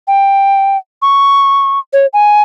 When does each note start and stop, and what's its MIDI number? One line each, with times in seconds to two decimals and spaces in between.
0.08 0.77 79
1.02 1.79 85
1.93 2.06 73
2.13 2.42 80